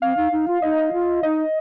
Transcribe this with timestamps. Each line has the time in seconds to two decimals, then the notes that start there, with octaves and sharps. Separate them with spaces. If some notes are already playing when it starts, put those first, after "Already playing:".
0.02 C4 F5
0.17 D#4
0.32 D#4
0.48 F4
0.62 D#4 D#5
0.93 F4
1.23 D#4 D#5